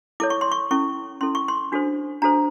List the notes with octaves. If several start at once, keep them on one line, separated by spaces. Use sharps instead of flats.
E4 A4 C#5 D6
C#6
C6
C#6
C#4 E4 A4 C#6
C#4 E4 A4 C6
C#6
C6
D4 F#4 A4 C5
D4 F#4 A4 C5 A#5